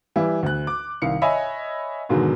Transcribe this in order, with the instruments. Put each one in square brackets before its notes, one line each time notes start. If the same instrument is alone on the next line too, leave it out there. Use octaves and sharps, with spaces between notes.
[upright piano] E3 G3 E4
D2 F#6
D6
C2 D#3 F5 C#7
C#5 D#5 E5 G#5 B5
G#2 B2 D3 D#3 F#3 G#3